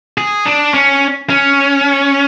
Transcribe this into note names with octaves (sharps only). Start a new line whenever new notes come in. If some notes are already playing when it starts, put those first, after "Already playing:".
G#4
D4
C#4
C#4